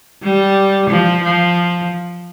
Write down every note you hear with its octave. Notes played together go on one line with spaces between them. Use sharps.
G3
F3
F3